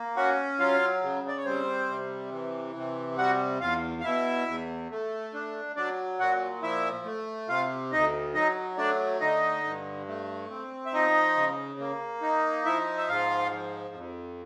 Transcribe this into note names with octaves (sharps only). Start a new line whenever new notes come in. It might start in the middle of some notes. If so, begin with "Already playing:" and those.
Already playing: A#3
C#4 F#4 F#5
F#3 F4 F5
C#3
D5
C#5
G3 C4 C5
C3
E3
C3
G3 F#4 F#5
E2 F4 F5
F5
B2 E4 E5
E2
A3
D4
F#3 D4 D5
A#2 F#4 F#5
F3 E4 E5
A3
C3 F4 F5
D2 D#4 D#5
F#3 D#4 D#5
A3 D4 D5
D3 D#4 D#5
G2
A3
C4
E5
F3 D#4 D#5
C#3
A#3
D#4
F3 E4 E5
E5
G#2 F4 F5
F3
F2